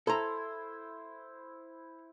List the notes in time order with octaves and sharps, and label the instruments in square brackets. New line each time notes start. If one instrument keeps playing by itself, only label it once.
[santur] E4 C5 [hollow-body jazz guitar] A4 A#5